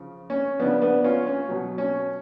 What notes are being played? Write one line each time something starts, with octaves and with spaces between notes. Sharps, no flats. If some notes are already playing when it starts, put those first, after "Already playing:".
Already playing: C#3 F3
C#4
C#3 F3 B3 D4
B3 D4
C#4 F4
C#4
B2 F#3
C#4